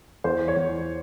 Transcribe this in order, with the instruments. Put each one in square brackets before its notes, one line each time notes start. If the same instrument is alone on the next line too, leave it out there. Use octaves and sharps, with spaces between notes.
[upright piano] E2 C5
C#5
E2